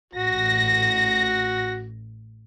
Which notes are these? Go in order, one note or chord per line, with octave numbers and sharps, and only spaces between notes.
A1 F#4 A#6